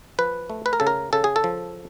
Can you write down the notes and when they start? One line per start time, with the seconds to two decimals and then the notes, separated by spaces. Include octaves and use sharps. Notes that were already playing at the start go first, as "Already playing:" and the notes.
0.19 F3 B4
0.50 A3
0.66 B4
0.73 A#4
0.80 C#3 A4
0.87 A#4
1.13 C#3 A4
1.24 G#4
1.36 A4
1.44 F3